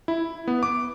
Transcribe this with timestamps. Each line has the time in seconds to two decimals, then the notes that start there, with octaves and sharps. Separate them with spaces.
0.08 E4
0.48 B3
0.63 D6